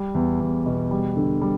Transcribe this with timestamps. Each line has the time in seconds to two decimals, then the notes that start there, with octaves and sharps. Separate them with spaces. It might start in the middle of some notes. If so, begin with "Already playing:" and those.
Already playing: G3
0.14 E2
0.40 E2
0.66 B2
0.91 G3
1.16 D3
1.41 G3